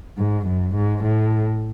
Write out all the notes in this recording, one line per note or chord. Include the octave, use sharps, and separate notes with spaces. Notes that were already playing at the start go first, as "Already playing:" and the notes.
G#2
F#2
G#2
A2